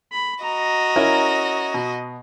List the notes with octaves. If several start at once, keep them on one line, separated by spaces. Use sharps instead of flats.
B5
F#4 D#5 A#5
C#4 E4 A#4
B2